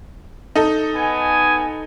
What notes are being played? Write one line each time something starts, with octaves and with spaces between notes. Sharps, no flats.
D#4 A4
B3 G#5